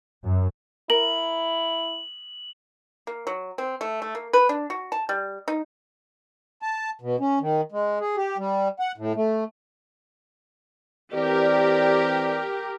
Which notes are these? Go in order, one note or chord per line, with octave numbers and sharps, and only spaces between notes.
F#2
E4 A#4 F#7
A#3
F#3
C4
A3
A3
A#3
B4
D4
F#4
A5
G3
D#4
A5
B2
C#4
D#3
G#3
G#4
G4
G3
F#5
A2
A3
E3 C4 G4 A#4 D5